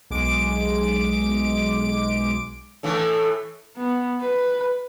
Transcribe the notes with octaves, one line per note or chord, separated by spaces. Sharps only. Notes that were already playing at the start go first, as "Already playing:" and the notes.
B1 G#3 D6 D7
A2 E3 A3
B3
B4